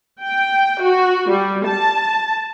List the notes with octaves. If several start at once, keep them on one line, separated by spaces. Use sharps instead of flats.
G5
F#4
G3
A5